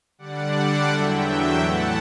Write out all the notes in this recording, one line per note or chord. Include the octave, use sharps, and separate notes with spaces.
D3 G3 D4 D5 F#5
E2 D3 F#3 E5 G5
A2 E3 A3 F#5 A5